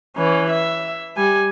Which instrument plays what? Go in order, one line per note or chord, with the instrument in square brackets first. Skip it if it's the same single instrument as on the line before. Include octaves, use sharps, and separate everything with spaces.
[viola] E3 C#4
E5
G3 G#5